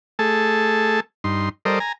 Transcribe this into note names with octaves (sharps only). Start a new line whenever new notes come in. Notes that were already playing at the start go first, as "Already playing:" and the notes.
A3 G#4 A4 A5
G2 D#4 C6
G3 A4 A#4 C5 D5 D#5
G#5 A#5